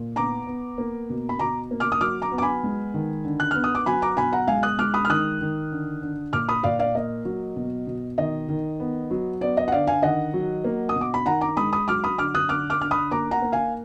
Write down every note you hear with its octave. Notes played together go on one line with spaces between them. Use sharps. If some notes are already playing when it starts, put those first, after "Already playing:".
Already playing: A#2
B3 A#5 D6
B3
A#3
B2
B5
B2 A#5 D6
A#3
D6 F6
D#6
F#3 D6 F6
A#5 D6
B3
D6
G#5 B5
G#3
D#3
D3
F#6
B3 F6
D#6
D6
F#3 G#5 B5
A#5 D6
B2 G#5 B5
F#5 A#5
G#3 F5 G#5
D#6 F#6
G#3 D6 F6
B5 D#6
F6
D#3 D#6 F#6
D#3
D3
D3
A#2 D6 F6
B5 D#6
A#2 D5 F5
D5 F5
A#3 D#5
F#3
B2
B2
D#3 D#5
D#3
B3
F#3
B3 D5
D#5
F#5
D3 D5 F5
F5 G#5
D#3 D#5 F#5
F#3
A#3
D#6
B2
D6
B5
D#3 F#5 A#5
A#5 D6
G#3 B5 D#6
B5 D#6
F#3 D6 F6
B5 D#6
D3 D6 F6
D#6 F#6
D3 D6 F6
D6 F6
D3 F6
B5 D#6
A#3 A#5 D6
F#5 A#5
A#3
F5 G#5